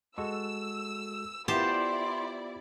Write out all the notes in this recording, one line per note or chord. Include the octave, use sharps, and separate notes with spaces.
G#3 F#4 A4 E6
B3 E4 F4 G4 C5 D5 A5 C6